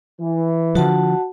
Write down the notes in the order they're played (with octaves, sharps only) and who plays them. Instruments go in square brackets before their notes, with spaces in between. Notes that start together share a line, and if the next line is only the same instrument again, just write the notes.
[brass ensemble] E3
[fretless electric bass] D3 F3 [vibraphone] F#4 F#5 A5